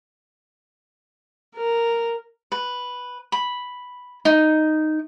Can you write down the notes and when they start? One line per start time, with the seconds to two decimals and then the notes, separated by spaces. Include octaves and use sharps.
1.57 A#4
2.52 B4
3.32 B5
4.25 D#4